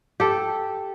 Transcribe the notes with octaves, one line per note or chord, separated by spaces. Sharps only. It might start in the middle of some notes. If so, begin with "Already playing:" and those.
G4 A4